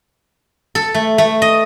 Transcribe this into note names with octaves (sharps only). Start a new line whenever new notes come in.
A4
A3
A3
D#5